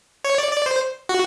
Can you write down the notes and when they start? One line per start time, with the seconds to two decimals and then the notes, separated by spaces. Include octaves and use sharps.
0.25 C#5
0.38 D5
0.52 D5
0.66 C5
1.09 F#4